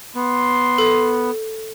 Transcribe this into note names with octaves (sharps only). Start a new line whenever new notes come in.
B3 C6
A4